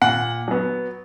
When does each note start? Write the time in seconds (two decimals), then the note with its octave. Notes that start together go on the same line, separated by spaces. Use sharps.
0.01 A#2 F#5
0.48 F#3 B3